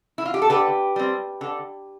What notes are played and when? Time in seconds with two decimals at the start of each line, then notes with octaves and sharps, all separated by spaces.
0.18 E4
0.26 F4
0.34 G4
0.42 A4
0.50 D3 G4 B4
0.96 G3 C4
1.41 D3